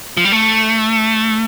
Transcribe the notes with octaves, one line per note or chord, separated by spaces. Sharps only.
F3
G3
A3